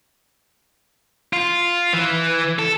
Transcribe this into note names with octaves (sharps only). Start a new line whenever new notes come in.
F4
E3
A4